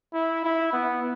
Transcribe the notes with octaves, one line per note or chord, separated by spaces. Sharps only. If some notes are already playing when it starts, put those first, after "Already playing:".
E4
E4
B3